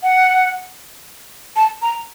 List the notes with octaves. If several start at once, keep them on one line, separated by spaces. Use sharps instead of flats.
F#5
A5
A#5